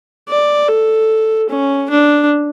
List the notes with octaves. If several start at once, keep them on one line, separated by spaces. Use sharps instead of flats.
D5
A4
C#4
D4